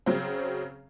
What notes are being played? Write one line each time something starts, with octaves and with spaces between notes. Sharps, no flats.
C#3 F#3 C4